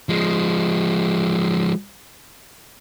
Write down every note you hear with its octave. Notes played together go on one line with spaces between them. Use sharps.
F3 G#3